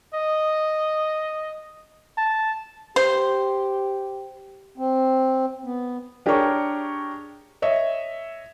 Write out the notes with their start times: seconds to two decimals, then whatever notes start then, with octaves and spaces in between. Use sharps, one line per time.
0.14 D#5
2.18 A5
2.96 G4 C5
4.78 C4
5.65 B3
6.26 D4 G4 G#4 A#4 C#5 C#6
7.62 C#5 D#5 E5